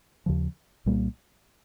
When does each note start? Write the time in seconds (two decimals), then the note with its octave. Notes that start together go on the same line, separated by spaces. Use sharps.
0.26 D#2 C#3 F3
0.86 C2 A#2 G3 A#3